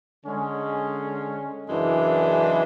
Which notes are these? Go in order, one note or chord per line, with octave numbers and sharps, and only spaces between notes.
D3 G#3 C#4
F#2 C#3 E3 G#3 D4